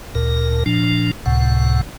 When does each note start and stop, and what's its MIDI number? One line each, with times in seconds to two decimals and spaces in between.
0.15 0.64 38
0.15 0.64 46
0.15 0.64 70
0.66 1.11 46
0.66 1.11 53
0.66 1.11 62
1.26 1.81 37
1.26 1.81 45
1.26 1.81 48
1.26 1.81 78